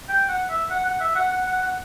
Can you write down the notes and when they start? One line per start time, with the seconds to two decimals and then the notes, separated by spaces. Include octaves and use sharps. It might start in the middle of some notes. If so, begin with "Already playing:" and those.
0.09 G5
0.29 F#5
0.49 E5
0.70 F#5
0.85 F#5
1.00 E5
1.15 F#5
1.31 F#5
1.47 F#5
1.62 F#5